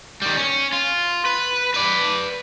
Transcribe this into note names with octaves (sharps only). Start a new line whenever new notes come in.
D#3 G3
C#4
F4
B4
B4 D5